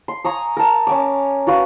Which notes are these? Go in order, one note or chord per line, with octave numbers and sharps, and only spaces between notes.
C6
G#5 A#5 C#6 D#6
A#4 A5
C#4 G#5 D6
F4 F#4 B4 F#5